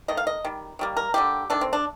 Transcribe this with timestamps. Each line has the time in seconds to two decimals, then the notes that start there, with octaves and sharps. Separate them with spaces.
0.08 D#3 A3 D#5
0.17 F5
0.27 D#5
0.45 D#3 G3
0.79 D#3 G3 A#3
0.97 A#4
1.14 D3 G3 A#3 G4
1.50 D#3 A3 D4
1.61 C4
1.73 D4